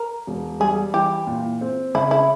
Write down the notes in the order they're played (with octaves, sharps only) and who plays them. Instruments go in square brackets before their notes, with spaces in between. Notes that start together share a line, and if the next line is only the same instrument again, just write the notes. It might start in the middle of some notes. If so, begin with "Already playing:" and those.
Already playing: [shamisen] A#4
[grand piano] E1
[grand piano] G3 [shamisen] G#4
[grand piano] E3 [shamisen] G4
[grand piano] A#2
C4
[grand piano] C#3 [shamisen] E4
[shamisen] E4